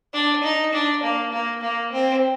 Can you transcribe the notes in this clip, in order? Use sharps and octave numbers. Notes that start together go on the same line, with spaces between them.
D4
D#4
D4
A#3
A#3
A#3
C4